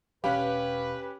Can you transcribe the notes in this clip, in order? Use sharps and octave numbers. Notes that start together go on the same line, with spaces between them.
E1 C#4 G4 B4 F5 B5